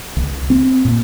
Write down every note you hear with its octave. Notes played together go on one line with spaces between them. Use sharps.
C#2
C4
A#2